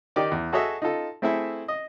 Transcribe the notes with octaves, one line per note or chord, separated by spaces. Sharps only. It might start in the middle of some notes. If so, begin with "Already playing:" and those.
D#3 D#4 G4 D5 D6
E2
F#4 G#4 A4 C#5 D#5 E5
D#4 F4 A4
A3 C4 E4 G#4 A4 E5
D#5